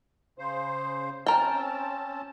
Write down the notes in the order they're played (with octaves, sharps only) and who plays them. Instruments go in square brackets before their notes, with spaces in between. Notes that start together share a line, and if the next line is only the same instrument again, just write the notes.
[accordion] C#3 C5
[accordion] C4 C#4 A5 [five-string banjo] A#4 G5